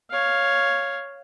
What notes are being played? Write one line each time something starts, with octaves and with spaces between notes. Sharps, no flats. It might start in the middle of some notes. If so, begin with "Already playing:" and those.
C#5 F5